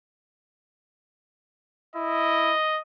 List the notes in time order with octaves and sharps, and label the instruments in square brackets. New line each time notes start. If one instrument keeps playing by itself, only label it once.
[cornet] E4 [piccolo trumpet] D#5